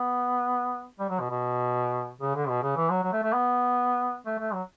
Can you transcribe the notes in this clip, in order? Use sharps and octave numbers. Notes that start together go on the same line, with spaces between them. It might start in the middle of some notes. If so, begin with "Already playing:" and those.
Already playing: B3
G3
F#3
B2
B2
C#3
D3
B2
C#3
E3
F#3
F#3
A3
A3
B3
A3
A3
F#3